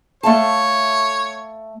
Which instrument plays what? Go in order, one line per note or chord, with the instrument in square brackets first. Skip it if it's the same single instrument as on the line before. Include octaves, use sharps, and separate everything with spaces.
[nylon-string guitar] A3 F5 A5 [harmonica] C#5